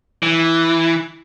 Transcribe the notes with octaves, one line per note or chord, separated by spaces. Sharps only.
E3